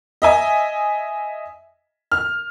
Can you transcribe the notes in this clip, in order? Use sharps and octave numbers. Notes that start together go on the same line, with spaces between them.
D#5 E5 G#5
F6